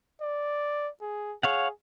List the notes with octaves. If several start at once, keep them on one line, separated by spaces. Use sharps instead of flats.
D5
G#4
G#4 C#5 F5 F#5